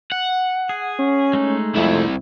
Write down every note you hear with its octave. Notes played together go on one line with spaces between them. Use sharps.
F#5
G#4
C#4
G#3 A3 D#4
C2 F2 E4